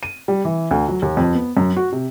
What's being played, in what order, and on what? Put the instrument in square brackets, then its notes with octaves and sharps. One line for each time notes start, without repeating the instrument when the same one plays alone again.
[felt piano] D#7
G3
E3
D2
F#3
D#2
F2
B3
F#2
F#4
C3